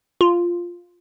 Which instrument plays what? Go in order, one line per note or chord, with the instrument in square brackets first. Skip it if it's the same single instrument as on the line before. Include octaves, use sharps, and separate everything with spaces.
[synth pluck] F4